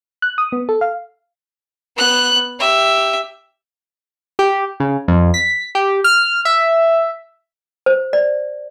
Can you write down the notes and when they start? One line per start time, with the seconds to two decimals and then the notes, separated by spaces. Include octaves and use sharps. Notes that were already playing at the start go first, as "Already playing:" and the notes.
0.22 F#6
0.38 D#6
0.52 B3
0.69 A4
0.81 F5
1.97 B3 F#6
2.59 G4 E5
4.39 G4
4.80 C#3
5.08 F2
5.34 B6
5.75 G4
6.04 F6
6.45 E5
7.86 C5
8.13 D5